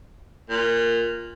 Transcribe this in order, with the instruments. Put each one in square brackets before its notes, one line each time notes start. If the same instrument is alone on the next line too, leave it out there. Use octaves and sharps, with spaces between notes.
[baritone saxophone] A#2